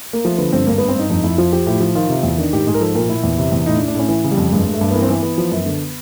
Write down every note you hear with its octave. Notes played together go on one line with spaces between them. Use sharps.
A#3
F3 A3
D3 B3
G2 C4
G2 A#3
G2 B3
C4
G2 D#4
F2 D#4
F2 E4
F3 F4
F3 G4
A2 G4
F3
D#3 F4
C3
E2
D#3 D4
G#2 G4
G#2 G#4
A#4
F3 A4
A#2 A#4
A#2 E4
E2
C3
E2
A2 D#4
D4
A2
D4
A2 C#4
E3
C#3
G3
F2
G2 G#3
G2
A3
G2
B3
E3 A#3
C4
E3 B3
E3 B3
F3
F#2
D3